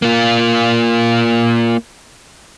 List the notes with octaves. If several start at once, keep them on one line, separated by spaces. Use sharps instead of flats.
A#3 F4